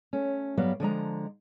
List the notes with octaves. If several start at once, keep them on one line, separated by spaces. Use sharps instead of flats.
A3 C#4
G2 F#3 G3 B3 F5
D3 F3 G#3 A#5